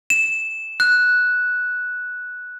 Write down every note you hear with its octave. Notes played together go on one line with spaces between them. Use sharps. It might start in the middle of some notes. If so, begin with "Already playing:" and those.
E7
F#6